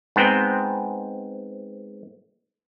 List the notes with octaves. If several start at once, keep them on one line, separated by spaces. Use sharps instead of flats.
G#2 B3 C4 G5